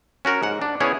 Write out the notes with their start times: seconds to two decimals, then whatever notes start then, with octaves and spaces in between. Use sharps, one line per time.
0.25 C#4 F#4 A#4
0.43 G#2 F#5
0.62 D4
0.80 B3 C#4 E4 G#4 C#5